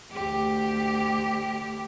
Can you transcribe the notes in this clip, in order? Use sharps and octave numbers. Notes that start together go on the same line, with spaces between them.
D2 G4